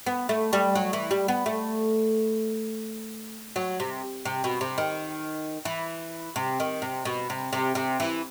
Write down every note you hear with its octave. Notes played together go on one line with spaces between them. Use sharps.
B3
A3
G3
F#3
E3
G3
B3
A3
F#3
C3
C3
B2
C3
D#3
E3
C3
D#3
C3
B2
C3
C3
C3
E3